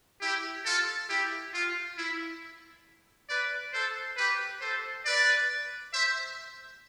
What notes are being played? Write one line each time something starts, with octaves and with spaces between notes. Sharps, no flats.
E4 G4
F4 A4
E4 G4
F4
E4
B4 D5
A4 C5
G4 B4
A4 C5
B4 D5
C5 E5